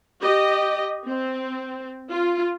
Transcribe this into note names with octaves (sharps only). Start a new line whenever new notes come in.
G4 D#5
C4
F4